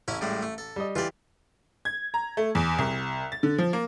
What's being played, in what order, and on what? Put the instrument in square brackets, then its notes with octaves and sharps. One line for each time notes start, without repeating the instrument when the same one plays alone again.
[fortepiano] A1 [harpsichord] C#4 E4 C#5
[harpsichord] A2 G3 G#3
A3
A4
[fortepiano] G3 D#5
[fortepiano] E3 G4 [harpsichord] F4 D5
[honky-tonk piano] G#6
A#5
A3
E2
C2
A6
D3
F3
A#3